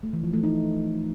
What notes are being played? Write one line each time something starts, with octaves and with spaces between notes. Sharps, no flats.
A3
E3
F3
A3
D#4